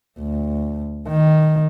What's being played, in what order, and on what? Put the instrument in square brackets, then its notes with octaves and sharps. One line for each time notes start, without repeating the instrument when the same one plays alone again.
[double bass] D2
D#3